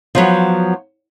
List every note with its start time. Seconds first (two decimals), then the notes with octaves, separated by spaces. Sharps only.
0.15 F3 F#3 B3